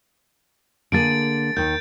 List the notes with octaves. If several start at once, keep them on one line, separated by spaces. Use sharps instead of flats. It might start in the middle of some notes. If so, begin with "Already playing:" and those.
D3 A#3 G#4 A6 D7
D#2 D#3 G6